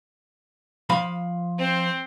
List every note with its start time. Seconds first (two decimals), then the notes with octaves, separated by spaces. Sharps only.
0.89 F3 F5 B5
1.58 C4 C5